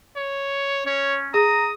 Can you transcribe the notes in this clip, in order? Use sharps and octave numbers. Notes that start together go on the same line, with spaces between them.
C#5
C#4 C#5
G#4 A#5 D#6